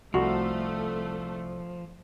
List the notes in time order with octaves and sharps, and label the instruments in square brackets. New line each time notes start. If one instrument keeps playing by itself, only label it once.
[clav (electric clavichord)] C2 [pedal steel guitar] F3 [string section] A3 [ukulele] F#4